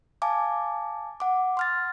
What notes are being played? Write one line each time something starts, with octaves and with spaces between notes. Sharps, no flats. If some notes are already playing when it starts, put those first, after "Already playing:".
F5 G#5 A5 D6
F#5 D6
C6 F6 A6